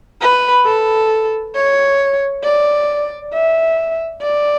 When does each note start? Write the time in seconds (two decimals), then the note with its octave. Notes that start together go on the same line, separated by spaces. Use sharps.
0.21 B4
0.65 A4
1.55 C#5
2.44 D5
3.34 E5
4.22 D5